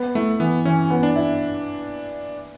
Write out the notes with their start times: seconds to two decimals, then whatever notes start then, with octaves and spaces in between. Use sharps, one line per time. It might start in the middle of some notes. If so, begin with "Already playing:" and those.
Already playing: B3
0.15 A3 E4
0.40 E3 B3
0.65 E3 C#4
0.90 B3
1.03 D4
1.16 E4